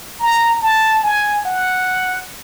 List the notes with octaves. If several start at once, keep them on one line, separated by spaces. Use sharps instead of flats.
A#5
A5
G#5
F#5